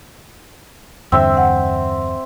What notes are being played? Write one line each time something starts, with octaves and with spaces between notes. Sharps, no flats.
E2 G2 D3 C4 E5 E6
F#5